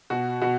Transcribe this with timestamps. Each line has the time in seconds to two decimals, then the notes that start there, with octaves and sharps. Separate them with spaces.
0.10 B2 F#4
0.41 B2 F#4